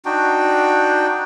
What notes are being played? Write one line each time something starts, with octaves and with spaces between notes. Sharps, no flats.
D4 D#4 F#4 G5